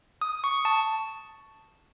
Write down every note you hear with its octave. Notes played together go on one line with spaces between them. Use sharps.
D#6
C#6
A5